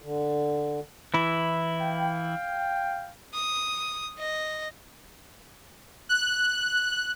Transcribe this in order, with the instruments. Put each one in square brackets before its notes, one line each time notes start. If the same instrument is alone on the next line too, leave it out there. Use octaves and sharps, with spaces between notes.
[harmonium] D3
[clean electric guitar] E3 E4
[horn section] F5 G5
[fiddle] D#6
D#5
[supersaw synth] F#6